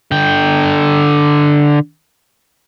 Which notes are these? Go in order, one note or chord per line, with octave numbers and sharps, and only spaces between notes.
D3 G5